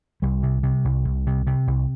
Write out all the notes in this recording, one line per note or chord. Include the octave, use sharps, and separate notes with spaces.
C2 G3
C3
C3
C2
C2
C3
C3
C2